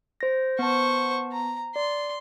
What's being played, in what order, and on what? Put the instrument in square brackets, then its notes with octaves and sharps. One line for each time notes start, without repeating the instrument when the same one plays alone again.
[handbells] C5 A#6
[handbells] B3 A5 [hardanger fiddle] C5 C#6
[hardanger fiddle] A#5
[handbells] D5 [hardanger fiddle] C6